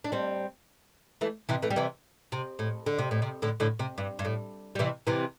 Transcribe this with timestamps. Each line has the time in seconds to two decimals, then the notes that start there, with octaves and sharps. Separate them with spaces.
0.04 D4
0.12 G3 C4
1.21 E3 A3
1.49 C3 E3
1.62 E3 A3
1.70 G3
1.76 C3 E3
2.32 C3
2.59 A2
2.86 D3
2.98 C3
3.11 A2
3.22 C3
3.42 A2 D3
3.60 A2 D3
3.79 C3
3.98 G2
4.19 G2
4.25 A2
4.75 G3
4.79 C3 E3
5.07 C3 E3